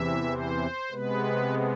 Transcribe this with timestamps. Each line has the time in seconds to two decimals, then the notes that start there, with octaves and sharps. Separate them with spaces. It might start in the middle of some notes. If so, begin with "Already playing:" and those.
Already playing: E2 C3 E3 E5
0.30 C5
0.91 C3 G#3 B3 B4